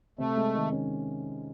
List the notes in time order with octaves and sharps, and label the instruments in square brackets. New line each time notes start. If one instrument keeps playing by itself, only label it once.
[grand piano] C3 [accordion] A3
[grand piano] G#3
D#3
C#4